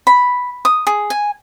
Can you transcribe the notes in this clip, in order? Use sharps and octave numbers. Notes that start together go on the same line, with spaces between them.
B5
D#6
G#4
G#5